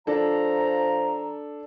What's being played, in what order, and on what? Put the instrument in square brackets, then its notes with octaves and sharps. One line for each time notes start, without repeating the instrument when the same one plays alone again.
[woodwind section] F3 A#5 [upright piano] D4 A4